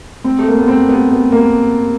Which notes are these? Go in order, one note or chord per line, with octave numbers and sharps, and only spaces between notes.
C4
A3
A#3
B3
C4
B3
B3
A#3